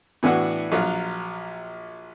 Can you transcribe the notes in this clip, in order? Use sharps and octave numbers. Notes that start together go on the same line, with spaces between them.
A2 E3 B3 D4 F#4
A#1 F#3 F4